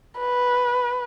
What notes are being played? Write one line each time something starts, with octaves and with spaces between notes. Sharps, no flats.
B4